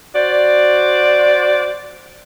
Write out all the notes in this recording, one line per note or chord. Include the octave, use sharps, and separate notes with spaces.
F#4 C5 D5